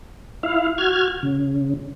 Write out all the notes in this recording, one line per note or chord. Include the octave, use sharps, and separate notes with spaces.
E4 F5
F#4 F6 G#6
C#3